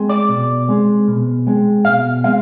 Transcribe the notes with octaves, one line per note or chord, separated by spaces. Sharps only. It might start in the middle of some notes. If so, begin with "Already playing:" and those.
Already playing: G#3 C4
D5
B2
G#3 C4
B2
G#3 C4
B2 F5
G#3 C4 F5